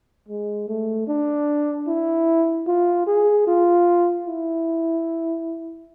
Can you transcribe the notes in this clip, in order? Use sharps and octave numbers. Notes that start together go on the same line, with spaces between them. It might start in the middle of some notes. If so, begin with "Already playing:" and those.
G#3
A3
D4
E4
F4
G#4
F4
E4